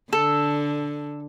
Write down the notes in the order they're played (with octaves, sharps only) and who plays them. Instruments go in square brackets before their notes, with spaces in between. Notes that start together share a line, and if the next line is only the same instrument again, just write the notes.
[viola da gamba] D3 [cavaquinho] A4